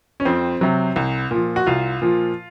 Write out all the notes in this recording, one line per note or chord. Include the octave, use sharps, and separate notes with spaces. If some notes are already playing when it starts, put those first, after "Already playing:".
C#4
F2 C4
C3 F#3
C2
A#2 F3
F#4
C2 F4
A#2 F3